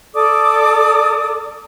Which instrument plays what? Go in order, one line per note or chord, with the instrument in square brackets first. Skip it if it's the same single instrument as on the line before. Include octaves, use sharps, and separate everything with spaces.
[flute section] A4 D5 D6 D#6